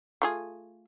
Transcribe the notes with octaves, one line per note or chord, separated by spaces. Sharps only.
A3 F4 G#4